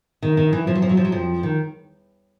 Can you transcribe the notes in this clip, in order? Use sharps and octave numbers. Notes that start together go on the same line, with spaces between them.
D#3
D#3
E3
F3
F#3
F3
F#3
F3
F#3
F2 F3
D#3